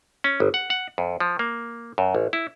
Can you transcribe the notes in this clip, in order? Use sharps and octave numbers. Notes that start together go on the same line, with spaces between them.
C#4
G1
F#5
F#5
F2
F3
A#3
F#2
A1
E4